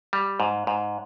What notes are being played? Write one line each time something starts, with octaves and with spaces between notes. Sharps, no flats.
G3
G#2
G#2